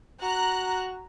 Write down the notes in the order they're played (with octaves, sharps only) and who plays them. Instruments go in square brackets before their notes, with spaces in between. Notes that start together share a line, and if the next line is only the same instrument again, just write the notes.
[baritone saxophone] F#4 [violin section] A#5 F#6